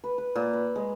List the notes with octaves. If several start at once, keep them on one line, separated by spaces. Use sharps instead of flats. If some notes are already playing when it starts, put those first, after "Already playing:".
B4
B4
A#2
B4
G#3